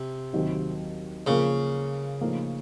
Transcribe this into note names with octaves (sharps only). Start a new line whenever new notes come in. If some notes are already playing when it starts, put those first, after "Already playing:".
Already playing: C3
D#2 D#3 F#3 C4
C#3 F3 A#3 F4 A#4
A2 F3 A#3 D#4 A#4